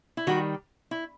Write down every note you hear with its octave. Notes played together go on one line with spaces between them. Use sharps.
E4
D#3 G3 F#4
E4